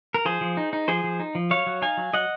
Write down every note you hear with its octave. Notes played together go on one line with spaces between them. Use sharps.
A#4
F3 G#4 C5
F3
D#4
D#4
F3 G#4 C5
F3
D#4
F3
F#3 C#5 F5
F#3
D#4 F5 G#5
F#3
F#3 D#5 F#5